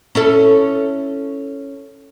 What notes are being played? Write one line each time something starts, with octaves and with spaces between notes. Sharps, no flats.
C#4 E4 A4